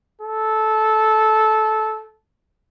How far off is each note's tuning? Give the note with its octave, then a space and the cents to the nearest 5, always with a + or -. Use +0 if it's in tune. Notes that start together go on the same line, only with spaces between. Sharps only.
A4 -15